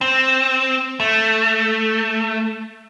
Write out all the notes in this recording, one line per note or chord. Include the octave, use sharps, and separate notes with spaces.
C4
A3